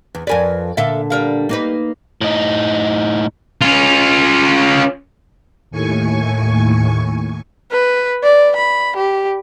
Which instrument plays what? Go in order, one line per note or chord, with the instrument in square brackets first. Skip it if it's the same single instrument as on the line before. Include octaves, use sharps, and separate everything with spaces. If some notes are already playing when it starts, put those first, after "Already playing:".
[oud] E2
[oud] F2 A#4 B4 [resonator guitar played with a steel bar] D5 G#5
[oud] A#2 D3 [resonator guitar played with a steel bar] A4 E5 F5
[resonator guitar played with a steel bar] G3 A#4 F5
[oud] A#3 D#4 B4
[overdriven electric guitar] A2 D#4
[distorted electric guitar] C#4 F4
[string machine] D#2 A2 G#5 C#6
[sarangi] B4
D5
B5
G4